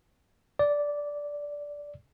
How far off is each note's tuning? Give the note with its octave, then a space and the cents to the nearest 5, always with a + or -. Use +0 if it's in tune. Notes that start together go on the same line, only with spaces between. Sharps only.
D5 -10